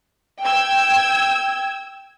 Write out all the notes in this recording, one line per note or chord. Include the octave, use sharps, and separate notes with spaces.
G5 E6 G6 G#6